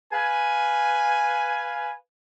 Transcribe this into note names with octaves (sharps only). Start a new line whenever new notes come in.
B4 F5 G#5